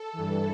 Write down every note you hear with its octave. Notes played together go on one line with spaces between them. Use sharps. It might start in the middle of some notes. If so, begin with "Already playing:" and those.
Already playing: A4
G2 E3